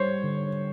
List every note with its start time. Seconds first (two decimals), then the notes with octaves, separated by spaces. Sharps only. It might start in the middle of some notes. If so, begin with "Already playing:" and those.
Already playing: G3 C5 C#5
0.24 D3